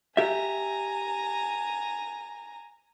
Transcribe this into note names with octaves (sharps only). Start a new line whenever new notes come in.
G4 E5 G#5 A#5